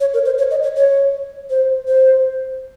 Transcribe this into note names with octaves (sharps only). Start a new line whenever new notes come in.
C#5
A#4
C5
C#5
D#5
C#5
C#5
C5
C5